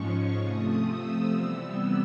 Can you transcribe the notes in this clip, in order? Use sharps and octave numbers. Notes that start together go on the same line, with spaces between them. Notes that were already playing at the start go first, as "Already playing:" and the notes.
Already playing: G#2 F3 G#3 C#4 C#6
C3 F3 A3 D#6
E6
C3 E3 G3 B3